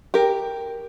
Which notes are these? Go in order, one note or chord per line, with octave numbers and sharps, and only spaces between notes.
G4 A#4